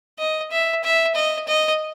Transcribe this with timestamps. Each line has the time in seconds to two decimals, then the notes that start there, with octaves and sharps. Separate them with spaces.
0.19 D#5
0.51 E5
0.84 E5
1.15 D#5
1.48 D#5